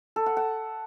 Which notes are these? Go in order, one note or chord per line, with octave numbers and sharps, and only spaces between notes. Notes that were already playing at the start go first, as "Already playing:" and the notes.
A4
F#5
F#5